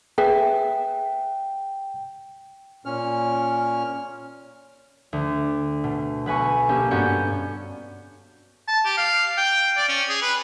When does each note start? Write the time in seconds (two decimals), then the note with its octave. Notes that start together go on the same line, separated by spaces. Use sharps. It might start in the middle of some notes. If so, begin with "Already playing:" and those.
0.18 G#4 B4 E5 G5
2.85 A#2 C#4 F6
5.13 D2
5.84 B2
6.26 B1 B4 G#5 C#6
6.69 A#3 C#4 G4 A4
6.91 G2 B3 C#4 F#4 G6 C#7
8.68 A5
8.85 G4
8.97 F5
9.37 G5
9.77 D5
9.89 C#4
10.09 G#4
10.22 B4